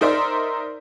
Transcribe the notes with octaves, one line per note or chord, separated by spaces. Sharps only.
D#4 A#4 C5 D5 E5